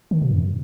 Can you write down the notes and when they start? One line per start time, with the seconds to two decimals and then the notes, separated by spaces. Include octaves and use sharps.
0.11 D#3
0.22 B2
0.31 F#2